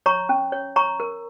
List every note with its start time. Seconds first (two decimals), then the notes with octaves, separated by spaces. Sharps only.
0.06 C#5 A#5 C#6
0.29 C#4
0.52 C#5
0.76 C#5 A#5 C#6
1.00 A#4